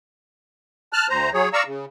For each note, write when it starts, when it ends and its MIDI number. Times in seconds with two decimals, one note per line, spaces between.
0.93 1.07 81
0.93 1.07 89
0.93 1.07 90
1.09 1.30 38
1.09 1.30 72
1.09 1.30 82
1.34 1.49 54
1.34 1.49 68
1.34 1.49 73
1.53 1.63 74
1.53 1.63 77
1.53 1.63 82
1.53 1.63 85
1.53 1.63 88
1.66 1.85 49